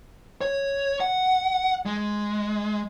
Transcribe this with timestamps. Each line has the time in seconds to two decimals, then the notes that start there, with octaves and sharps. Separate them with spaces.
0.41 C#5
1.00 F#5
1.86 G#3